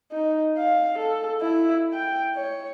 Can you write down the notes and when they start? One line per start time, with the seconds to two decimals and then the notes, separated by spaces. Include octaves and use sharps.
0.11 D#4
0.57 F5
0.98 A4
1.41 E4
1.93 G5
2.36 C#5